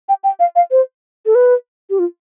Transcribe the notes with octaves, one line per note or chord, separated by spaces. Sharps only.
G5
G5
F5
F5
C5
A4
B4
G4
F4